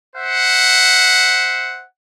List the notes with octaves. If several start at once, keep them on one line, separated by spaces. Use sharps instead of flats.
C5 E5 F#5